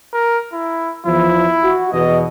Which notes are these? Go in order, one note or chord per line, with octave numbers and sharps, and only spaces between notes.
A#4
E4
E2 F3 E4
F#4
E2 B2 D#5